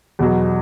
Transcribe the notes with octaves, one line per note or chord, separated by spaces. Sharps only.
E2 B2 F#3